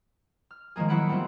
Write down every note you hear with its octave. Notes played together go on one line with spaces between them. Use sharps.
F6
D#3 F3 G#3 A#3 G#4
F#3 A#3 E4 F#5 B5 D7
G3 B3 C4 E4 F4